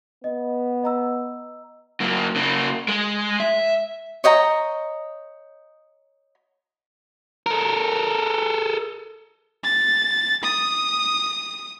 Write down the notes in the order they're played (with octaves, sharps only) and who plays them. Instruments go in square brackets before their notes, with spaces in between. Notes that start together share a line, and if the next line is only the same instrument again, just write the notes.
[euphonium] B3 [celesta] D#5
[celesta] D#5 A#5 E6
[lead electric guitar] F#2 A#3
C#3 A#3
G#3
E5
[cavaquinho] C#5 D#5 G5 A#5
[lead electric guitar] A4 A#4
[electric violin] A6
D#6